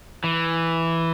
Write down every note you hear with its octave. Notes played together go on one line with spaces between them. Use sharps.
E3